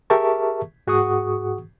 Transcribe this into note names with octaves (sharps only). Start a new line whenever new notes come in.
G4 G#4 A#4 E5 A5 C#6
G#2 F#4 G#4 F#5 C#6 D#6